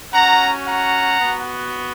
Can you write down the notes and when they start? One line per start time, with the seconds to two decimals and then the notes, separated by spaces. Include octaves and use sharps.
0.14 C#4 F#4 F#5 A#5
0.66 F#5 A#5
1.20 B3 F#4